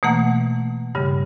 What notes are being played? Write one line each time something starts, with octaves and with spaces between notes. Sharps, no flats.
B2 E3 A3 A#3 F#5
G2 C#3 G3